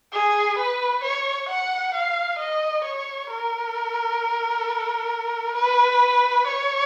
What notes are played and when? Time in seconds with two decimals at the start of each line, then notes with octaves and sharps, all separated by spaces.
0.13 G#4
0.58 B4
1.03 C#5
1.49 F#5
1.94 F5
2.39 D#5
2.84 C#5
3.30 A#4
5.55 B4
6.47 C#5